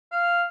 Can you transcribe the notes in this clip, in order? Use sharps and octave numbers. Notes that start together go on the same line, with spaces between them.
F5